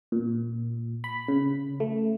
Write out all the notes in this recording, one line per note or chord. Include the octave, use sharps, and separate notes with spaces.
A#2
B5
C#3
A3